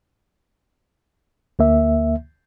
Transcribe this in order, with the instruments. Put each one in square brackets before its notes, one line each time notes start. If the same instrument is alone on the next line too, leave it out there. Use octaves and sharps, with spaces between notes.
[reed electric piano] D2 A#3 E5